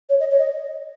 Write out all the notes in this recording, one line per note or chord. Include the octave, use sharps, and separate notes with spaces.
C#5
D#5
C#5
D#5